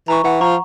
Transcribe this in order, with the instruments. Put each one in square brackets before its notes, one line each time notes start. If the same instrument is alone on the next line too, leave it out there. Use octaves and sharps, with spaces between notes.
[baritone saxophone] E3 [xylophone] A#5 C#6
[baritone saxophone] E3 [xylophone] F#5
[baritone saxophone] F3 [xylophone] A#5 C#6